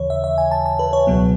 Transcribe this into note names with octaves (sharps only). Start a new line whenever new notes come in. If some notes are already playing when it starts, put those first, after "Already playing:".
Already playing: D#2 C#3 E3 C#5
E5
E5
G#5
A5
A5
B4
C#5
C#2 B2 F#3 B3